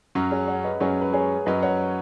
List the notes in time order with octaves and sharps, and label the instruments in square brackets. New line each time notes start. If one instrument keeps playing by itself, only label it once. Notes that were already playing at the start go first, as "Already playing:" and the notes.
[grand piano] F#2 F#3 C#4
[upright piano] G#4 C#5
C#5 F#5
B4 D#5
[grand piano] F#2 F#3 C#4 [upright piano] G#4 C#5
[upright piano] B4
G#4 C#5
[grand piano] F#2 F#3 C#4 [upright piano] B4 D#5
[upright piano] C#5 F#5